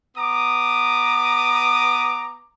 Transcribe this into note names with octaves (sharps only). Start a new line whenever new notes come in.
B3 A#5 D6 D#6